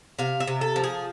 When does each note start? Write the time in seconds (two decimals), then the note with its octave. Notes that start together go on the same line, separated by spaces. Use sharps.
0.19 C3 F5
0.40 E5
0.47 C3
0.61 A4
0.76 F3
0.84 G#4